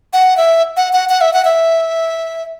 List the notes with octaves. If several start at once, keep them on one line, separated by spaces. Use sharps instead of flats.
F#5
E5
F#5
F#5
F#5
E5
F#5
E5